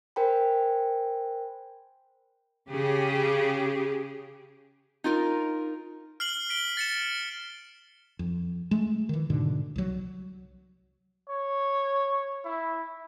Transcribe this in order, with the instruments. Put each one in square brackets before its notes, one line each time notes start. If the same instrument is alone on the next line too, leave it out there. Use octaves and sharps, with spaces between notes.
[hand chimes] A#4 C5 G5 G#5 B5
[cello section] C#3 G4 G#4
[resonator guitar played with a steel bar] D#4 F4 A#4
[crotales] F6 C7 F#7 G7
B6 D7 G7
A6 C#7 E7
[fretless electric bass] F2
G#3 A3
D#3 E3
G#2 B2 D3
C2 F#3
[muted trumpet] C#5
E4